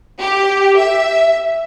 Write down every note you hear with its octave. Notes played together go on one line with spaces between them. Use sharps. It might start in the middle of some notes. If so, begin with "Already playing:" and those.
G4
E5